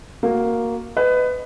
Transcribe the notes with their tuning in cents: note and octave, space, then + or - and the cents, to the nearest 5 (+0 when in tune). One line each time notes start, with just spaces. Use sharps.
A#3 +0 F#4 -5
B4 +20 D#5 -15